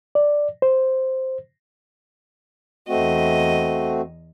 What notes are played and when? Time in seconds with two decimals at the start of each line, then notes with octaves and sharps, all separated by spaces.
0.15 D5
0.62 C5
2.88 E2 A3 C4 F#4 D#5